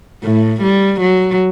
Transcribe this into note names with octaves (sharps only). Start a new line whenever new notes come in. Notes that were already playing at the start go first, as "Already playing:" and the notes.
A2
G3
F#3